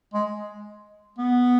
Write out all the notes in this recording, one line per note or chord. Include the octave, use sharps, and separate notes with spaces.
G#3
B3